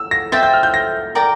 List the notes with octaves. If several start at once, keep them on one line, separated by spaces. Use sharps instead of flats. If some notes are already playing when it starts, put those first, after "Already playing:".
Already playing: E6
A#6
C5 E5 G5 A6
G6
F6
G6
A#6
A#4 D5 G5 A#5